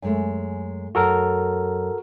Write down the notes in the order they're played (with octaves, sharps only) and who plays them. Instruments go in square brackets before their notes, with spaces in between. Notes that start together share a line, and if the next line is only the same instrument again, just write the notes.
[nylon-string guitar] F#2 G#3 A3
[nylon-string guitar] F#2 [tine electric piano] F#4 A4 A#4